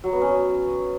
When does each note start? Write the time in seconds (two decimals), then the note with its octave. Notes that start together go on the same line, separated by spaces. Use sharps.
0.04 F#3
0.13 B3
0.22 C#4